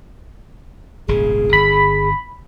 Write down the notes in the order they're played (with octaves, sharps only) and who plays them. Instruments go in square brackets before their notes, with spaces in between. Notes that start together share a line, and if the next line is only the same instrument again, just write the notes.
[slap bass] D#1 G#1 C#3 [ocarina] G#4
[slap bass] G1 [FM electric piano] B5